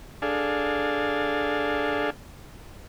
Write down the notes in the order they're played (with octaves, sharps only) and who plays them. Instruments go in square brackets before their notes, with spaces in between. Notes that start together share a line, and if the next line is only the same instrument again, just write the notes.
[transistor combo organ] D4 G#4 A4 F5